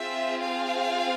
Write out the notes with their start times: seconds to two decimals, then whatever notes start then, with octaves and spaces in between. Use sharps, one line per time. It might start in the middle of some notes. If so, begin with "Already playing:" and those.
Already playing: C4 F4 G#4 E5
0.45 F5